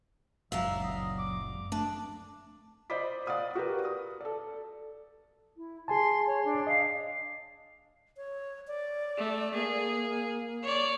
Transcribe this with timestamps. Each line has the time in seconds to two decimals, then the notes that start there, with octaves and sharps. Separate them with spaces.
0.52 F#1 C#2 F#3 D5 E5 F5
0.84 D#5
1.19 D6
1.72 A3 D4
2.90 C5 D5 D#5 B5 D6 B6
3.27 D5 F5 F#5 D#6
3.55 F#4 G4 A#4 B4
3.85 D#6
4.21 A4 D5
5.57 E4
5.88 G#4 G#5 A5 C6
6.27 C#5
6.44 D4
6.67 D#5 F5
8.17 C#5
8.67 D5
9.17 A3
9.54 A#3 G#4
10.63 C#5 D5